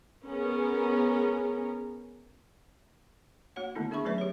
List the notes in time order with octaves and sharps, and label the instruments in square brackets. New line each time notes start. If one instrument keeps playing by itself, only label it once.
[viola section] B3 C#4 G#4 A#4
[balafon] A#3 F#4 C#5 F#5
D3 D#3 A3 B3 D#4 E4
D4 G#4 E5 B5 C#6
F#3 A3 C#4 B4 D5 E5
G4 C#5